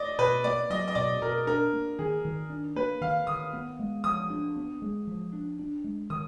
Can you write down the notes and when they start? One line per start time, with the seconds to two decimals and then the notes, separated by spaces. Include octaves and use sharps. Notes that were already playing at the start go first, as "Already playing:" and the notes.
Already playing: D5 D#5
0.18 B2 B4
0.44 A#3 D5
0.70 F#3 D#5
0.88 D#5
0.95 B2 D5
1.22 B2 A#4
1.47 D4 A#4
1.73 A#3
1.99 D#3 G#4
2.25 D#3
2.50 D4
2.76 A#3 B4
3.01 D#3 F5
3.27 D#3 D#6
3.53 B3
3.79 G#3
4.04 F3 D#6
4.30 D4
4.56 B3
4.82 G#3
5.07 F3
5.33 D4
5.59 D4
5.84 G#3
6.10 D#3 D#6